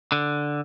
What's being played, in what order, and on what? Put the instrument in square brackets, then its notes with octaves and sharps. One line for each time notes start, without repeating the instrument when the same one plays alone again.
[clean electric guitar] D3